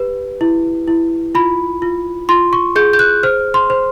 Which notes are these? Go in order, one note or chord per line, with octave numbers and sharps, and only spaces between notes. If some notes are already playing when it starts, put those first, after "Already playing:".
Already playing: G4 B4
E4
E4
F4 B5
F4
F4 C6
C#6
G#4 G6
G6
F#6
C5 F6
C6
C5